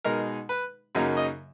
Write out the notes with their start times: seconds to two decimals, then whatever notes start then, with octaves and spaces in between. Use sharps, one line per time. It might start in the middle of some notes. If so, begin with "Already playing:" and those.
0.04 B2 G#3 D#4 A#4
0.49 B4
0.95 F#2 C#3 F#3 A#3 D#4
1.17 D#5